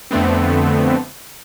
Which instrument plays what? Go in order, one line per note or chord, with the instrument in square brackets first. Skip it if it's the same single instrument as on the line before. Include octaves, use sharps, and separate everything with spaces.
[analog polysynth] F2 D3 A3 B3 C4